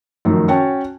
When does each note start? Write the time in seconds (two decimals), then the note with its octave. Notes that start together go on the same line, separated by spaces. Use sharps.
0.25 F#2 A2 D#3 F3
0.48 C#4 F#4 C#5 G5 A5